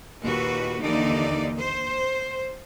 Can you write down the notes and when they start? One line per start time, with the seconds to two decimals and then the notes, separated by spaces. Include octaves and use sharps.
0.22 D#2 A#2 F#4 B4
0.81 D#2 D3 E3 D#4 D5
1.57 C5